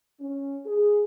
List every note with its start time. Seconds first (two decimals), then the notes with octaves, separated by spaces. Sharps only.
0.20 C#4
0.65 G#4